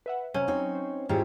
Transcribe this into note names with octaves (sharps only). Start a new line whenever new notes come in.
B4 E5 F#5
C3 F#3 C#4
C4 D#4 C#5
C5
G#2 E4 F4 G4 G#4 C#5